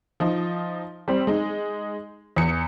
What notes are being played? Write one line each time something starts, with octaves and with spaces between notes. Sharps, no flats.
F3 D#4
G3 C4
G#3 D#4
E2 C#7